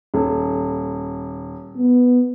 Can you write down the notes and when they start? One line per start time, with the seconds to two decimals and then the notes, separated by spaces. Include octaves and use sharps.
0.14 D#1
1.78 B3